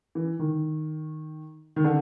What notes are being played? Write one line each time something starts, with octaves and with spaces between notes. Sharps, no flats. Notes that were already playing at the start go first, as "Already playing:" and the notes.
E3
D#3
D#3
D3